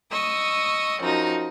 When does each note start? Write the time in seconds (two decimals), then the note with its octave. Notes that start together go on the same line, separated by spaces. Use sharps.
0.11 D#5 C#6 D#6 E6
1.00 F#2 F3 D#4 F#4